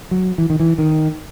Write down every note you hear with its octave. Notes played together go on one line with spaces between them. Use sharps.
F#3
E3
D#3
E3
D#3